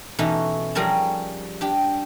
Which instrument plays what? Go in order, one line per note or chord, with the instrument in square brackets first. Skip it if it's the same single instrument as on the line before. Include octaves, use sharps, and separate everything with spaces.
[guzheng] B2 E3 C#4 D#4 E4 A4
F3 G3 G#4 A#4 C#5 A5
D4 G4